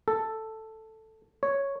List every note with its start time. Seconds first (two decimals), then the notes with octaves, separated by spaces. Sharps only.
0.08 A4
1.43 C#5